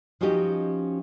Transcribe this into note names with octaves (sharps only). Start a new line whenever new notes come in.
F3 C#4 D#4 F#4 G4 D#5